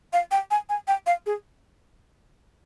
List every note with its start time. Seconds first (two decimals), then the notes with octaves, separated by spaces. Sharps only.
0.13 F5
0.31 G5
0.51 G#5
0.69 G#5
0.88 G5
1.07 F5
1.26 G#4